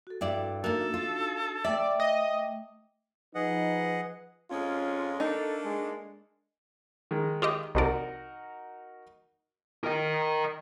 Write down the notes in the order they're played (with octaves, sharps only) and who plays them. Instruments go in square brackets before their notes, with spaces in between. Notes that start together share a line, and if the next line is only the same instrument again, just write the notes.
[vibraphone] F#4 A4
[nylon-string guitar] G2 E4 D5
[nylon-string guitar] A#3 A#4 [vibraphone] D4 D#4 F#4 [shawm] A4
[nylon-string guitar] F4
[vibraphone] A3 G5 D6 [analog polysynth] D5 [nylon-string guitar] E5
[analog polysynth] D#5
[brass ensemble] F3 B4 [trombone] D#4 [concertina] G#4 D#5 F#5
[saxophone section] F2 G#3 C#4 [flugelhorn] F4
[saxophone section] A3 A#3 D4 [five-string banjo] D#4 [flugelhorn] A4
[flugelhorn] G#3
[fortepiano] D#3 G#3
[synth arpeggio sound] F4 G4 D#5
[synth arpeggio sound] C2 C3 D5 [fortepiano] D#4 F#4 A#4
[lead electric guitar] A#4 D#5